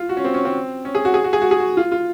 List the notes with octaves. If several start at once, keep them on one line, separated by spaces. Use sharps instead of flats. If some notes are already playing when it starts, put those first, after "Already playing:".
Already playing: F4
F#4
C#4
C4
C#4
C4
C#4
G#4
F#4
G#4
F#4
G#4
F#4
G#4
F#4
F4
F4